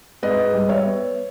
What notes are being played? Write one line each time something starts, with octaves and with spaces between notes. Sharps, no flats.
G#2 B4 D#5
G3
C#5 E5
B3